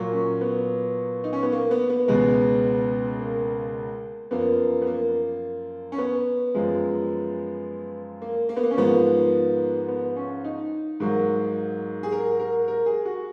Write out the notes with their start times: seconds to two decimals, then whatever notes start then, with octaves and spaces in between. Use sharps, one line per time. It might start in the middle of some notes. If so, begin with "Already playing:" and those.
Already playing: A#2 F#3 A#3
0.13 C#4
0.41 B3
1.24 D#4
1.33 C#4
1.43 B3
1.52 A#3
1.71 B3
1.90 B3
2.08 C#2 B2 G#3
3.20 A#3
4.31 F#2 F3 A#3 B3
4.82 B3
4.87 A#3
5.92 C#4
5.98 B3
6.55 F#2 F3 G#3
8.22 A#3
8.49 A#3
8.57 B3
8.63 A#3
8.71 C#4
8.77 G#2 F3 A#3 B3
9.88 B3
10.16 C#4
10.44 D#4
11.00 G#2 F#3 A#3
12.03 G#4
12.12 A#4
12.39 A#4
12.68 A#4
12.86 G#4
13.05 F#4